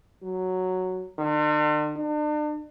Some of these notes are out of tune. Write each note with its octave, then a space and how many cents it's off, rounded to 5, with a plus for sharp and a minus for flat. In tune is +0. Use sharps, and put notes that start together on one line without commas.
F#3 +0
D3 +45
D4 +40